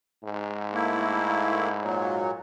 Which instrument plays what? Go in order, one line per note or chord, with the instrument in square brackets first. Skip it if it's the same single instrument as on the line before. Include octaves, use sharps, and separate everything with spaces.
[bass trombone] G#2
[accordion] A3 A#3 E4
A#2 F#3